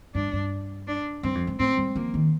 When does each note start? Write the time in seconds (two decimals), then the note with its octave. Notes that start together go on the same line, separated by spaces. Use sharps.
0.15 G2 D4
0.33 G2
0.87 D4
1.23 G2 C4
1.35 F2
1.47 G2
1.59 A2 C4
1.78 G3
1.95 F3 A#3
2.14 D#3